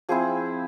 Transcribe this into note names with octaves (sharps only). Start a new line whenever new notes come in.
F3 C4 E4 G#4